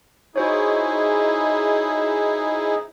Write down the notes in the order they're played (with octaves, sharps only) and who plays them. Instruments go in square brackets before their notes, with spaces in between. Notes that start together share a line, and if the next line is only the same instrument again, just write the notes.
[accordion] D#4 E4 G#4 [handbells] F#4 C5 C#5